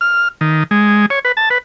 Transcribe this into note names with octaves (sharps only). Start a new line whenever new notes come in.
F6
D#3
G#3
C#5
B4
A5
B4